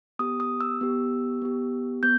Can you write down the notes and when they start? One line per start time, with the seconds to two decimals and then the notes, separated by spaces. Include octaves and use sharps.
0.19 B3 G4 D#6
0.40 D#6
0.61 E6
0.81 B3 G4
1.42 B3 G4
2.03 B3 G6